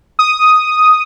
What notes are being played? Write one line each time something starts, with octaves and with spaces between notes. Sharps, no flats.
D#6